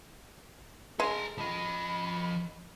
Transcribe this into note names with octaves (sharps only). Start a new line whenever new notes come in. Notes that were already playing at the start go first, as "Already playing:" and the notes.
G#3 A4 A#5
F3 D#5 B5